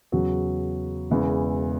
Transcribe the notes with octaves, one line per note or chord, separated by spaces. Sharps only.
E2 C#3 F#3
E1 E2 C#3 E3